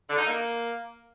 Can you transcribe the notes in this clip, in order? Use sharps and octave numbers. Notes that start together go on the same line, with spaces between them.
D3
D#4
A#3